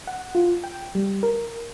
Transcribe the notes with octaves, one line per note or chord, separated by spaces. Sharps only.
F#5
F4
G5
G3
A#4